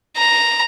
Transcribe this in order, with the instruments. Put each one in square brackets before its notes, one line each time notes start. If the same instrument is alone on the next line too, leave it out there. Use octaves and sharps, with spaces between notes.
[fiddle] A#5